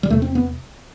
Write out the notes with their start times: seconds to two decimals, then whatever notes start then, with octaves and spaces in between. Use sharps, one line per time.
0.03 G3
0.09 E2 C3 A3
0.22 C4
0.35 B3